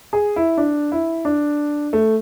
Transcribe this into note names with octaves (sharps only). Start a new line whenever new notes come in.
G#4
E4
D4
E4
D4
A3